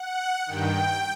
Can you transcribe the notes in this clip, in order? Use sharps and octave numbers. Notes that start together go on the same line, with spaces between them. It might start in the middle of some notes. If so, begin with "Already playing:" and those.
Already playing: F#5
G2 D#3 G5